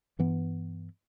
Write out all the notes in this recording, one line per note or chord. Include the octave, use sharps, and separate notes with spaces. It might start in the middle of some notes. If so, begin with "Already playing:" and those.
G2 E3 B3